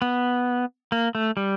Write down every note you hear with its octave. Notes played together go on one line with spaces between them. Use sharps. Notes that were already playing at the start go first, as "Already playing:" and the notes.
B3
A#3
A3
G3